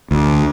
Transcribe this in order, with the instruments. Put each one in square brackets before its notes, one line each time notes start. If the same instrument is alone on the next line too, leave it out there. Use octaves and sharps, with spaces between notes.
[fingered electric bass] D2